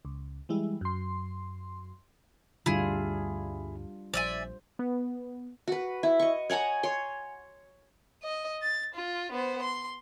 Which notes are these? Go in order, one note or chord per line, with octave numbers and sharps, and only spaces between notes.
C#2
E3 G3 G#3 E4
F#2 C6
D2 G2 D3 G3 D4 E4 F4 G#4
A#1 C5 D5 E5 G#5
B3
F#4 B4
E4
D#5 C#6
C#5 F#5 G#5 A#5
C#5 C6
D#5
A6
F4
B3 C5
C6